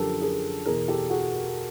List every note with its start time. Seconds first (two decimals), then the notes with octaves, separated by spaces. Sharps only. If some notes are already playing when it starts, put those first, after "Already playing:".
Already playing: F#2 D3 F3 G4 A4 A#4
0.21 G#4 A#4
0.65 E2 B2 G#4 A#4
0.88 G4 A4
1.10 F#4 G#4